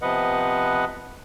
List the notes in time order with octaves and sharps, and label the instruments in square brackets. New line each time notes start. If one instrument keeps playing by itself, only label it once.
[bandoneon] C3 F3 B3 B4 D#5 F#5